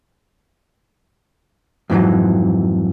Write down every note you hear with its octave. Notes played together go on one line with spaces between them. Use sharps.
F2 G#2 E3 F#3